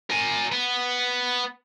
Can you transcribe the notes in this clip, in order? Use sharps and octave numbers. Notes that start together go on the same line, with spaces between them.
A#4 G#5
B3